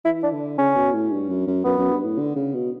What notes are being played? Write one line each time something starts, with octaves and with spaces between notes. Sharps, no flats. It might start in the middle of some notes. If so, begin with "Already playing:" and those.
E3 E4
D4
D3
C#3 C#4
B2
A2
G2
F#2
F#2
F#2 B3
F#2
G2
A2
D3
C#3
B2